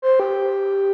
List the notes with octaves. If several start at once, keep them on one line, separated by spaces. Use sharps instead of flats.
C5
G4